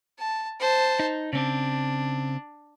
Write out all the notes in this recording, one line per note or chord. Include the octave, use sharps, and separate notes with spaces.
A5
C5 A5
D#4
C#3 C4 D4